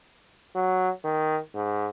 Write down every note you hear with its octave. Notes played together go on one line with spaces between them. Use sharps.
F#3
D#3
G#2